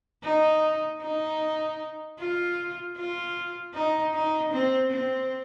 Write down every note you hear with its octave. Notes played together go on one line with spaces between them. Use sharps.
D#4
D#4
F4
F4
D#4
D#4
C4
C4